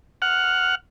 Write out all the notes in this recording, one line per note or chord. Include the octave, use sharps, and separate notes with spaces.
F#5 F6